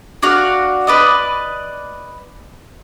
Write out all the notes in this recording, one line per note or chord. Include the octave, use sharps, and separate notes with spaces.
D4 F#4 F5
B4 D5 D#5